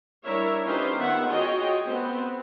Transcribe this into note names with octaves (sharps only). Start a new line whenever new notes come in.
G3 D4 E4 A#4 C#5 E5
C#4 D#4 F4 G4 B4 C5
D#3 B3 E5 F#5
F4 F#4 G#4 C#5 D#5 G5
B3 C4